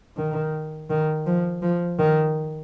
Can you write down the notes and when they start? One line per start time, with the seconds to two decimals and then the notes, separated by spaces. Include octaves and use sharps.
0.17 D#3
0.90 D#3
1.26 F3
1.62 F3
1.99 D#3